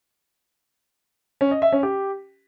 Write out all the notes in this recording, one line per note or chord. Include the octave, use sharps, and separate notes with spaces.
C#4
D#5
E5
C#4
G4